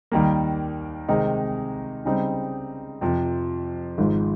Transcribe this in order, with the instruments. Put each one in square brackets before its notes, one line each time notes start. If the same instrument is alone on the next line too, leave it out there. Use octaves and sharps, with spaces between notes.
[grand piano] D#2 D#3 G3 A#3
C3 D#3 G#3 C4 D#4
C#3 G3 C4 D#4
F2 C3 F3
G#1 G#2 F3 G#3